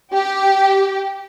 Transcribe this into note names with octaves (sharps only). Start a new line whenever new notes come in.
G4